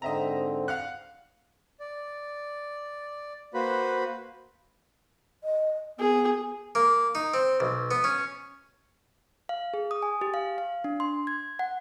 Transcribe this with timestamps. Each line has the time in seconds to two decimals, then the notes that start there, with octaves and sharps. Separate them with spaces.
0.02 G#2 D3 C4 D#5 E5 A#5
0.68 F5 F#5 F#6
1.80 D5
3.54 A#3 F#4 B4 C5 B5
5.44 D#5
5.99 B3 G#4
6.75 A#3
7.15 D#4
7.34 C4
7.60 B1
7.91 B3
8.04 C#4
9.49 F5
9.74 G#4
9.91 D#6
10.02 G#5
10.21 G4
10.34 F5
10.58 F5
10.84 D4
11.00 C6
11.27 G#6
11.59 F#5